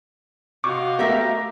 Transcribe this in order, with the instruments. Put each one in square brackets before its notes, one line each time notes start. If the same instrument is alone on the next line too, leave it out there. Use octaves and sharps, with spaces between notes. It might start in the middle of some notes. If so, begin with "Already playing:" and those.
[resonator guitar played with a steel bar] C3 [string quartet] F#4 D#5 F5 [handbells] C#6 D6
[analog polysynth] A3 B3 [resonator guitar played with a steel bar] G4 A#4 E5